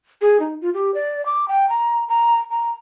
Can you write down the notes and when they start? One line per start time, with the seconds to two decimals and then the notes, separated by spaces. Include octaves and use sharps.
0.22 G#4
0.40 D#4
0.61 F4
0.74 G4
0.94 D5
1.26 D6
1.48 G5
1.69 A#5
2.08 A#5
2.51 A#5